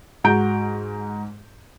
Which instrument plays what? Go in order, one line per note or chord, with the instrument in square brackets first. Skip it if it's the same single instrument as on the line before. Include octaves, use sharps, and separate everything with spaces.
[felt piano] G#2 F#4 A#5 G6 D7